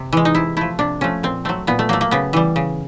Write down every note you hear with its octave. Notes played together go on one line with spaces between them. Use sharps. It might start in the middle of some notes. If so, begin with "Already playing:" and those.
Already playing: C3
E3 G#3
D#4
C3 E4
F3 A3 E4
C3 D4
F3 A3 C#4
A#2 C4
F#3 A3 C4
A#2 B3
A3
F#3 A3 A#3
A#3
C#3 B3
E3 G3
C#3